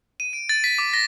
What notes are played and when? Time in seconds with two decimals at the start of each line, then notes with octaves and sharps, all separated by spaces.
0.20 D#7
0.33 D7
0.49 A6
0.64 B6
0.78 D6
0.93 A#6